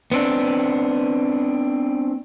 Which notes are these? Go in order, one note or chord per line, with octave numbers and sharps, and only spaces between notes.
B3 C4 D4